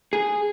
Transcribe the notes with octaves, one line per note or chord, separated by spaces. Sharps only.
G#4